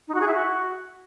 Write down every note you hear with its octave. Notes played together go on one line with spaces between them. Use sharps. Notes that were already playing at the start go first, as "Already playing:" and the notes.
D#4
F#4
G#4
E4
F#4